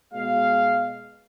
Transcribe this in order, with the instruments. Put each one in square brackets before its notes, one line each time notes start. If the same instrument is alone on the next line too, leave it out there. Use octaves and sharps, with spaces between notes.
[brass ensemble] B2 G#3 F5